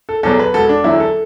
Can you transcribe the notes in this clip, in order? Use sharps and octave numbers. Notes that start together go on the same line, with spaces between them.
A4
E2 B2 F#3 A4
B4
E1 A4
D4
E2 D3 F#3 E4
A4